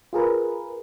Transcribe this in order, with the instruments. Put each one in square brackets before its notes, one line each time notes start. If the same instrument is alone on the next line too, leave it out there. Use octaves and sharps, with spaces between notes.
[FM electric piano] F4 G#4 A#4 B4